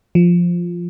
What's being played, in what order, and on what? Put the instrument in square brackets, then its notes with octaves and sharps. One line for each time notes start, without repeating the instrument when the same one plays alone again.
[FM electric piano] F3